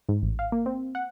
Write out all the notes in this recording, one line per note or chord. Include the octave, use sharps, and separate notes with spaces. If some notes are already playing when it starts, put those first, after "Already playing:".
G#2
A1
F5
A#3
C4
F#5